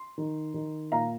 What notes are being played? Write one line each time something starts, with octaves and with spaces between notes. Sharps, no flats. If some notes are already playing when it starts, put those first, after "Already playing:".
Already playing: C6
D#3
D#3
A#2 F5 A#5